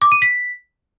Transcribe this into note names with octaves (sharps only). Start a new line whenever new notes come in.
D6
D#7
B6